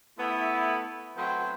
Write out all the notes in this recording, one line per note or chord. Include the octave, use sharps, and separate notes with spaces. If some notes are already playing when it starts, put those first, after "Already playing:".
A3 B3 E4
F#3 A3 B3 C4 B4 C5